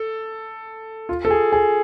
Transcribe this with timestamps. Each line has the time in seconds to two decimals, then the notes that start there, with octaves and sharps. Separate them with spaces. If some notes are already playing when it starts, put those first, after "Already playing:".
Already playing: A4
1.09 F4
1.25 A4
1.31 G#4
1.52 G#4